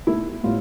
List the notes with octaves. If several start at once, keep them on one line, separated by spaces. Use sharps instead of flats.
B2 A3 E4
A2 G3 B3 F4